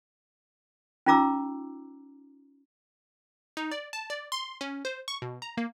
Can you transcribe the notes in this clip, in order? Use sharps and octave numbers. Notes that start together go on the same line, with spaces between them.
C#4 D#4 F4 A#5 D6 E6
D#4
D5
A5
D5
C6
C#4
C5
C#6
B2
A#5
A#3